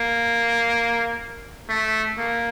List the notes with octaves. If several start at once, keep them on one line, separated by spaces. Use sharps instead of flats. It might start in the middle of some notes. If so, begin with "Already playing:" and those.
Already playing: A#3
A3
A#3